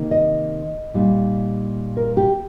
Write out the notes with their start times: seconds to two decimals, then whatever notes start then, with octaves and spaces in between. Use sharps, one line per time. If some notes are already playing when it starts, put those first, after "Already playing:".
Already playing: C3 D#3 A#3 D#4
0.11 D#5
0.94 A#2 G3 D#4
1.97 A#4
2.17 G4